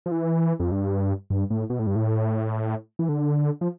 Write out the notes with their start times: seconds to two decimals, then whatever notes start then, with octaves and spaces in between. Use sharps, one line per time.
0.06 F3
0.11 E3
0.60 F2
0.71 G2
1.30 G2
1.50 A2
1.70 B2
1.79 A2
1.87 G2
1.96 A2
2.99 E3
3.09 D3
3.61 F3